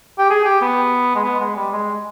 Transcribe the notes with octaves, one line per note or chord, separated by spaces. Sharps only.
G4
G#4
G4
B3
G#3
B3
G#3
G3
G#3